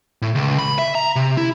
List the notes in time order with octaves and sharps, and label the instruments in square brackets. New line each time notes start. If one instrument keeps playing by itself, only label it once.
[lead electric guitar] A2
C#2
B5
E5
A#5
C3
E4